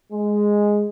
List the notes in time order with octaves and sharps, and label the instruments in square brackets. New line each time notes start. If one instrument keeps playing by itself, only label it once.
[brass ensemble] G#3